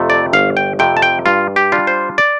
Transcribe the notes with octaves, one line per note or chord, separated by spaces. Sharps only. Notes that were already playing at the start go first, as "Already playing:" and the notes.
Already playing: F2 C3 A3
D5
G1 F5
G5
F2 C3 A3 G5
A5
G5
G2 F4
G4
G3 D4 F4
C5
D5